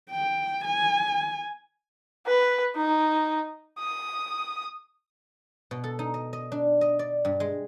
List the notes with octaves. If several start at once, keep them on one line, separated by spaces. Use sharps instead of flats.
G5
G#5
B4
D#4
D#6
B2
A4
D#4
D#5
D#5
D4
D#5
D5
G2
G#3